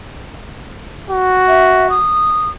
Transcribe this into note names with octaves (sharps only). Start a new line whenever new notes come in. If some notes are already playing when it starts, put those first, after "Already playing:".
F#4
E5
D#6